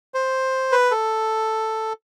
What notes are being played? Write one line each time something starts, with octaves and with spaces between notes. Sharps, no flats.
C5
B4
A4